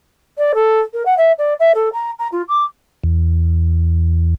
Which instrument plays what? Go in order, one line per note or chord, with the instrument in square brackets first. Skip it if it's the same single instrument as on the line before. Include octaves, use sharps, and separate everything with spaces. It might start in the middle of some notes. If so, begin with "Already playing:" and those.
[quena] D5
A4
A#4
F#5
E5
D5
E5
A4
A#5
A#5
F4
D6
[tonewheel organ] E2